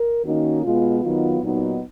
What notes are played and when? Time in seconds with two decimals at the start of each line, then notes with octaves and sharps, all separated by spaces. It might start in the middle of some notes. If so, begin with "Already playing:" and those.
Already playing: A#4
0.24 D#3 A#3 C#4 D#4 F#4
0.63 B2 G#3 B3 F4
1.03 D#3 F#3 B3 D#4 F4
1.41 A#2 F#3 B3 D#4